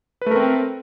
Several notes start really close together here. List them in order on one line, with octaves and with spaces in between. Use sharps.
B4 A3 A#4 C4